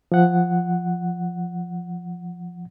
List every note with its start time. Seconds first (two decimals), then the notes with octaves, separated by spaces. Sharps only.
0.12 F3 F#5